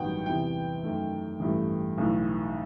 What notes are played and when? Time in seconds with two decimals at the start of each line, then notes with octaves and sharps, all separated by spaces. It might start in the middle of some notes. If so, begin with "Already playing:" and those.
Already playing: A1 G2 D#3 F#3 B3 F#5 G5
0.26 E2 C3 E3 B3 G5
0.84 F#2 D#3 A3
1.40 A1 G2 E3 A3
1.98 B1 A2 E3